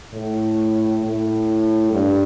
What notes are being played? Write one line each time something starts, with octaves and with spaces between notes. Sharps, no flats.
A2
A2
G2